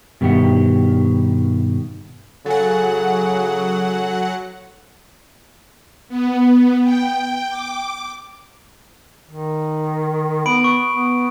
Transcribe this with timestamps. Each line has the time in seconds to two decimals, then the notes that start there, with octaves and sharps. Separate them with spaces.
0.21 G2 B2 D#3 G4 E5 F#5
2.46 C#3 F#3 A4 F#5 G#5
6.09 B3
6.83 G5
7.50 D6
9.30 D#3
10.46 B3 B5 D7
10.64 C#6
10.92 B3